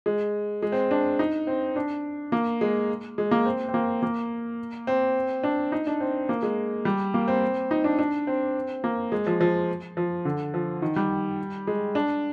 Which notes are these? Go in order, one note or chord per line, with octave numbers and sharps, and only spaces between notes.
G#3
G#3
C4
D4
D#4
C4
D4
A#3
G#3
G#3
A#3
C4
C4
A#3
A#3
C4
D4
D#4
D4
C4
A#3
G#3
G3
A#3
C4
D#4
D4
D4
C4
A#3
G#3
F3
F3
F3
D3
F3
D#3
G3
G#3
D4